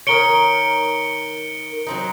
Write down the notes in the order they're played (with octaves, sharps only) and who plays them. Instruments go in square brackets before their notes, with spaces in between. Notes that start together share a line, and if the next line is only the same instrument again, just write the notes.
[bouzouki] D#3 A#4 C#5 [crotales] C#7 D7 G7
[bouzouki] F#3 C4 D#4